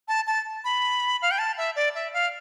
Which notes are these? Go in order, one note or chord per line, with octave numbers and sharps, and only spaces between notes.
A5
A5
B5
F5
G5
A5
E5
D5
E5
F5